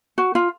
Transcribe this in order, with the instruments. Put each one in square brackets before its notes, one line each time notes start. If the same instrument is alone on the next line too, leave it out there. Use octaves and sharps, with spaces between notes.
[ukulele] F#4
F4